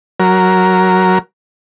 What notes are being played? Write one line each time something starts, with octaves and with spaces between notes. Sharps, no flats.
F#3 A#4